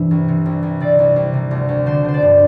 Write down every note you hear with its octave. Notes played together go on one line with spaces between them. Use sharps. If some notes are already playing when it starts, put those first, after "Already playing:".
Already playing: G2 C3 E3 C5 E5
C2
C3
C2
C2
C3 D5
C2
C2
C3
D2
D2
D3 C5
D3 C5
D5
G2